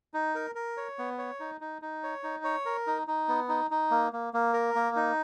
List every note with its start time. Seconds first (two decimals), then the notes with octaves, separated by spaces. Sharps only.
0.14 D#4
0.35 A#4
0.55 A#4
0.77 C#5
0.98 B3
1.18 C#5
1.40 D#4
1.61 D#4
1.82 D#4
2.03 C#5
2.23 D#4
2.44 C#5
2.66 A#4
2.87 D#4
3.07 D#4
3.28 B3
3.49 D#4
3.71 D#4
3.91 A#3
4.13 A#3
4.34 A#3
4.54 A#4
4.75 A#3
4.96 D#4